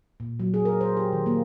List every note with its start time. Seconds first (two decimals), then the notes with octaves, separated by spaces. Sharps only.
0.20 A#2
0.40 F#3
0.54 G#4
0.65 A#4
0.81 C5
0.97 G4
1.13 D#3
1.26 A#3